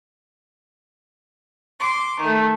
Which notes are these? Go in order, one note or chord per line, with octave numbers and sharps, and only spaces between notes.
C6 D6
D#3 A3